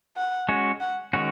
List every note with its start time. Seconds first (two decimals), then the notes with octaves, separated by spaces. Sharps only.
0.17 F#5
0.49 G#3 C#4 F#4
0.80 F#5
1.13 D#3 G#3 C#4 F#4